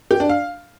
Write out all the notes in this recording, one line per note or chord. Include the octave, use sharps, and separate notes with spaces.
G4
D4
F5